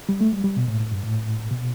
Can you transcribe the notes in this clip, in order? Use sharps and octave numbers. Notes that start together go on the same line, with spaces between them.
G3
A3
G3
G3
B2
A2
A2
G2
A2
B2